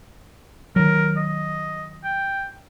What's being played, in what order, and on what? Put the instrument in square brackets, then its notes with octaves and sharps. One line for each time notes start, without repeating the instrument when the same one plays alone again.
[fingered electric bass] D#3 F#3 [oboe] A#4
[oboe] D#5
G5